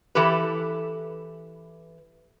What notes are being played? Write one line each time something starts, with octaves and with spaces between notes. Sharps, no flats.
E3 G4 A4 B4